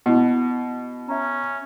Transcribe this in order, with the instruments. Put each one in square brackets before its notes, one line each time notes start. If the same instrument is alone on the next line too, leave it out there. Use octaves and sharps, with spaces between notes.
[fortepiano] B2 [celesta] E4 F#5
[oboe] C#4 [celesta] E5 A#5